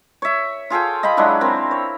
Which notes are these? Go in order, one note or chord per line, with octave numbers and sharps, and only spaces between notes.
C#5 E5
F4 G#4 A4 G5
D#5 F5 G5 B5
F#3 G#3 D4 E4
C4 A#4
C#5